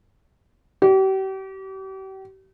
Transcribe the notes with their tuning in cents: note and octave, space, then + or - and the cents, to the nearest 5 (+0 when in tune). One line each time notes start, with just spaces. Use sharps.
G4 -40